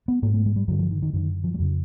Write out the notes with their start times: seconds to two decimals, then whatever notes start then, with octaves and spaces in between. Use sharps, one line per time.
0.08 B3
0.23 G#2 A#3
0.34 A3
0.46 G#3
0.56 G3
0.68 G2 D3 F#3
0.79 F3
0.91 D#3
1.02 D#3
1.13 F#2 D3 D#3
1.44 F3
1.54 G3
1.58 F2 C#3 F#3